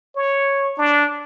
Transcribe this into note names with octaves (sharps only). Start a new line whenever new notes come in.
C#5
D4